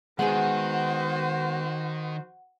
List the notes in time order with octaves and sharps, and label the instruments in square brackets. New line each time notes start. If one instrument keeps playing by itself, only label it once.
[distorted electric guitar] D#3 [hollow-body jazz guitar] G#3 B3 G#4 [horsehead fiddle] F#4 C5 [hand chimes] F#5